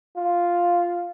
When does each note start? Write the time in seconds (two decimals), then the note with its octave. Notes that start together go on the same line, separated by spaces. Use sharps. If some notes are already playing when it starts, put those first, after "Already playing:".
0.16 F4